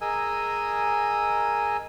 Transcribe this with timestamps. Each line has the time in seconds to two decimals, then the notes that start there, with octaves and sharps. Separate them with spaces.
0.01 G#4 A#4 D#5 G#5 E6